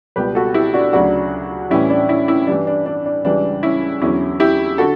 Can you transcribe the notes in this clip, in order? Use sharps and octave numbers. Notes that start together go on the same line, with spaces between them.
C#2 B2 G3 G4 B4
F#4 A4
E4 G4
D4 F#4
D2 C#3 F#3 D4 F#4
A2 E3 G3 C#4 E4
D4
C#4 E4
C#4 E4
G2 E3 G3 D4
D4
D4
D4
C#2 C#3 E3 G3 D4
C#4 E4
E2 D3 F#3 C#4 E4
E4 G4
D3 F#4 A4